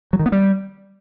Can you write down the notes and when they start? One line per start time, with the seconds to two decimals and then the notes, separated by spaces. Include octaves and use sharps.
0.13 F#3
0.19 D#3
0.26 B3
0.32 G3